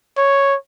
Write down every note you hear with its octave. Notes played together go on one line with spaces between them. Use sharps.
C#5